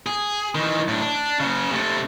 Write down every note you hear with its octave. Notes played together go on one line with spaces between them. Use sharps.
G#4
D#3 E3
A2 D4
D4
C#3 F#4
C3 A3